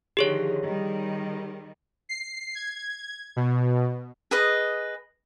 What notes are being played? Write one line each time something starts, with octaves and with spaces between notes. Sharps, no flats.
D3 D#3 F3 G4 G#4 C#5
D#3 G3
C7
G#6
B2
G#4 B4 D#5